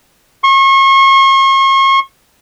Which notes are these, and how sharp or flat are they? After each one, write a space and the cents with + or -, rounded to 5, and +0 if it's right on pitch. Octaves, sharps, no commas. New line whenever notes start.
C#6 -40